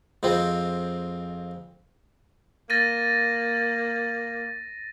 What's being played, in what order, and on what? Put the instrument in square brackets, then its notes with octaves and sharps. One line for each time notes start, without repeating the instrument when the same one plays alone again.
[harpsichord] F2 G#3 C4
[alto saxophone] A#3 [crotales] A6 A#6 D#7